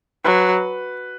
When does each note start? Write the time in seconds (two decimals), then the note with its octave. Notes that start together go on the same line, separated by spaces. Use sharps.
0.25 F#3 B4